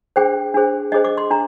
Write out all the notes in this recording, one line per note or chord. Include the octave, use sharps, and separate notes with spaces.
D4 G#4 C5 G5
D4 G#4 C5
D4 G#4 C5 D#5
D6
C6
D4 A#5